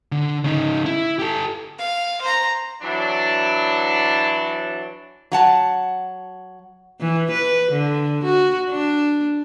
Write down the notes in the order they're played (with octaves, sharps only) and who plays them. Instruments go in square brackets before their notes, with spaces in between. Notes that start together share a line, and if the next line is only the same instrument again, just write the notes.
[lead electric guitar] D3
C#3 D#4
E4
G4 A4
[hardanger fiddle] F5
C5 A#5
[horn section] E3 F#3 D4
[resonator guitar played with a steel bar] F#3 F#5 A5
[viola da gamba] E3
B4
D3
F#4
D4